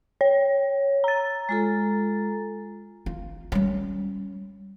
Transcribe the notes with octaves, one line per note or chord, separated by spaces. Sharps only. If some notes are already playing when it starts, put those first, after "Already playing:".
C#5
A#5 A6
G#3 F4 A4
F4
G3 C#4